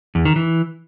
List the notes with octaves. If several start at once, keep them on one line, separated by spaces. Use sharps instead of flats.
E2
D#3
E3